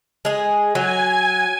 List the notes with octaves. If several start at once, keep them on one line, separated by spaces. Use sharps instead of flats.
G#3 G#4
F#3 G#5